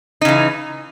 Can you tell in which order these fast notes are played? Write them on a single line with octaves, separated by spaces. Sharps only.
D#4 C#3 E3